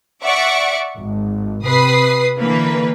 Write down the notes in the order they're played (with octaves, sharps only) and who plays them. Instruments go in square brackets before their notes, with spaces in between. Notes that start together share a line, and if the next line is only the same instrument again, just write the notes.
[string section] D5 E5 F#5 C#6 D6
G#1
C3 B4 D#6 C7
D3 E3 A#3 B4